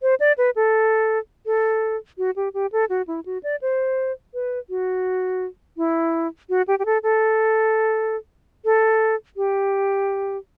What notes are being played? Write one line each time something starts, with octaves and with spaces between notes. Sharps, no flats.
C5
D5
B4
A4
A4
F#4
G4
G4
A4
F#4
E4
F#4
D5
C5
B4
F#4
E4
F#4
G4
G4
A4
A4
A4
G4